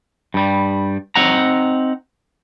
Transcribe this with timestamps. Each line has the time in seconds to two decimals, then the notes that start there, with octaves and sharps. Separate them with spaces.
0.34 G2 G3
1.15 C4 D#4 F#5 A#5